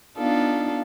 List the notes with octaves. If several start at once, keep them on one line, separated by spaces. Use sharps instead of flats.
B3 D4 D#4 F4 A4 F5